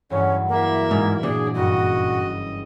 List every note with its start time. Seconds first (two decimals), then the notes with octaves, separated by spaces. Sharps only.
0.10 E2 G2 F#3 C#4
0.48 A#3 E4 E5
0.91 G#2
1.23 A#2 D4 G#4
1.55 F#1 G2 F#4 D#5